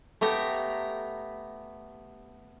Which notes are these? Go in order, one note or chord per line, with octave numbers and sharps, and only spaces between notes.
A3 B3 G4 A#5